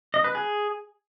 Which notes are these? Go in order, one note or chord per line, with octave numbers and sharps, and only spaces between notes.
D#5
B4
G#4